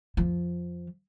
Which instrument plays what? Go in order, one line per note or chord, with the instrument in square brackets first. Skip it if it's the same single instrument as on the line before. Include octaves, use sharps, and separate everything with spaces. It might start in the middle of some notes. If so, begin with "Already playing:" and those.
[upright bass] F2 F3